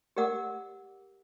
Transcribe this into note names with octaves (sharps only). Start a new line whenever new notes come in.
G4 A#4 D5 F#5 D6 E6